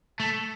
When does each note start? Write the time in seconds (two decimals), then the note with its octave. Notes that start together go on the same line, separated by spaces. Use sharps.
0.20 A3